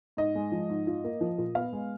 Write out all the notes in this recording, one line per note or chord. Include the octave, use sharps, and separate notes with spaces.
G#2 D#5
G#3
F3
G#2
F4
A#3
F3
A#2
B3 F5
G#3